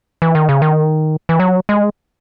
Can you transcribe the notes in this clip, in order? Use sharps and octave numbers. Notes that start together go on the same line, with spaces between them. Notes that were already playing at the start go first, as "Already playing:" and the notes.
E3
D#3
C#3
D#3
E3
F#3
G#3